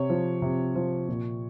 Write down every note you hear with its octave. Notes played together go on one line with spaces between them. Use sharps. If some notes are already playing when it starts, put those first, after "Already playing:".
Already playing: C3 C#5
F3
C3
F3
A#2